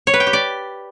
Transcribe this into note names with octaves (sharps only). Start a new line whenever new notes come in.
C#5
B4
G5
G4
D5